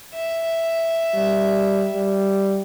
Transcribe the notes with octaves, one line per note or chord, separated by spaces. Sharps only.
E5
G3
G3